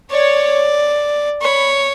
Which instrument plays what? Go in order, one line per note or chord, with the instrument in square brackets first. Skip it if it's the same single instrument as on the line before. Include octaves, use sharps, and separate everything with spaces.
[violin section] C#5 [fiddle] D5
[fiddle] C#5 [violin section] B5